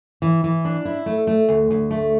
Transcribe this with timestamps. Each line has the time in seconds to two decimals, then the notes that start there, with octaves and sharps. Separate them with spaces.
0.22 E3
0.44 E3
0.65 D4
0.85 E4
1.06 A3
1.27 A3
1.49 D2
1.71 D2
1.91 A3